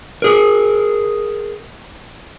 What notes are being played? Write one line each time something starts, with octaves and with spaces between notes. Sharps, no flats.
G#4 A#4